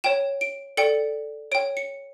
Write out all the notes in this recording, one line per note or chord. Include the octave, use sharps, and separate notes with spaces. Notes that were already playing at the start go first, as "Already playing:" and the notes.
C#5 G5 E7
D7
A4 D5 G5 C#7
C#5 G5 D7
C#7